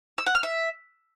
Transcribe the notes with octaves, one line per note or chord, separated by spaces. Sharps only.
E6
F#5
F6
E5